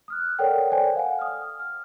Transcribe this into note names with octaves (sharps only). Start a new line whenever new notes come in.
D#6 F6 F#6
A4 A#4 C#5 D5 F#5 G5
A4 C5 D5 G5 G#5
F5 F#5 G#5
D#6 F6
F6